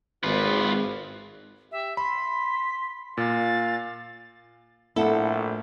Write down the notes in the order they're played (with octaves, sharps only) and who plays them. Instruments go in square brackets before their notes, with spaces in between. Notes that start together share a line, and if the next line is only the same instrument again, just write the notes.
[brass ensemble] G#1 [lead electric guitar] F4 B4
[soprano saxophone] G4 [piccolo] E5
[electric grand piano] B5 [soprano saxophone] C6 [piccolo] B6
[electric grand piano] A#2 [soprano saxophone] F5 [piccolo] A6
[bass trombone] A#1 [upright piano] A2 [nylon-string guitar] E4 F#5 [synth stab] A4